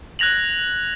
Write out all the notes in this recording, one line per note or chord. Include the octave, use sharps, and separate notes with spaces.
F#6 G#6 A#6 F7 F#7